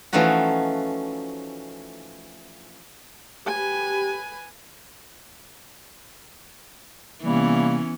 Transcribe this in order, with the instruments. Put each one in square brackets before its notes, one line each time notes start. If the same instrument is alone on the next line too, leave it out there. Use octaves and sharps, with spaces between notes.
[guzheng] E3 F3 A3 C#4 D#4 F#4
[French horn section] G4 [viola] B4 G#5
[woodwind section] C3 G3 A#3 [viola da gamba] E3 B3 C#4